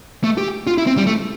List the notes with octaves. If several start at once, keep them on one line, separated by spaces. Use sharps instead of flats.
A3
G4
F4
E4
C4
G3
A3